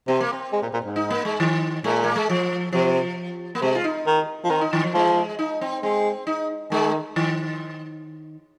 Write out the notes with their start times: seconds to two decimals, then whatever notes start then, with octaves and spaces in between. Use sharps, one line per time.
0.08 C3 C4
0.20 A#3
0.33 C4
0.52 G#3
0.62 A#2
0.73 A#2
0.84 G#2
0.96 D#4
1.10 A#3
1.25 G#3
1.40 D#3
1.84 A#2 G#3
2.04 A#3
2.16 G#3
2.29 F3
2.73 C3 F3
3.55 A#3
3.62 C3 G#3
3.75 F4
3.84 D#4
4.07 D#3
4.44 F3
4.50 D#3 C4
4.61 D#4
4.73 D#3
4.84 F3
4.94 F3 G#3
5.39 D#4
5.61 C4
5.83 G#3 C4
6.27 D#4
6.71 D#3 G#3
7.16 D#3